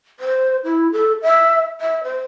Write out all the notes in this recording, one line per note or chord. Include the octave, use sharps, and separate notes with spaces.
C5
E4
A4
E5
E5
C5